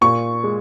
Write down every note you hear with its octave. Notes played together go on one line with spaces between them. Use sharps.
A#2 C#6
G#3